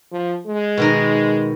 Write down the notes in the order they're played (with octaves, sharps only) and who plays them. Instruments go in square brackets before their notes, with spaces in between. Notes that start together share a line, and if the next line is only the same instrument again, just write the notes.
[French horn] F3
G#3
[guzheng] B2 D#3 A#4